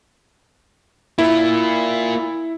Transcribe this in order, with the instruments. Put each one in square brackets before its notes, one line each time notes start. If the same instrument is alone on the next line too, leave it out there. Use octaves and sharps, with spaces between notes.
[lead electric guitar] A#3 F4 [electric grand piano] E4